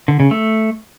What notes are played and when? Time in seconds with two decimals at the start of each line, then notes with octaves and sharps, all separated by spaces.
0.08 D3
0.20 C#3
0.31 A3